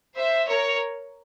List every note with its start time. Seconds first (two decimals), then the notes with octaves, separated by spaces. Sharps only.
0.16 C5 E5
0.48 A#4 C#5